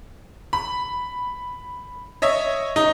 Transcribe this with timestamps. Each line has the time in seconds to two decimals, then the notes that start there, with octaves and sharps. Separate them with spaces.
0.53 B5
2.22 C#5 D#5 E5
2.76 D#4